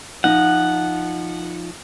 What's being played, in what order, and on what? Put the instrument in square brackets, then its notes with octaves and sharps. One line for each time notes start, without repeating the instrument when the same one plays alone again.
[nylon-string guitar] F3 D#4 [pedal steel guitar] F#5